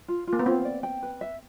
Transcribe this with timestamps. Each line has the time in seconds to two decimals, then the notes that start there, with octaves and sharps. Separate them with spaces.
0.08 F4
0.27 F4
0.33 A#3
0.39 B3
0.46 C4 F4
0.65 D5
0.83 G5
1.03 B4
1.21 E5